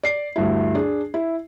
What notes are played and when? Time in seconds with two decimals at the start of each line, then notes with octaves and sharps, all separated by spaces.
0.03 D5 C7
0.36 D2 G2 E4
0.75 D4 G#4
1.14 E4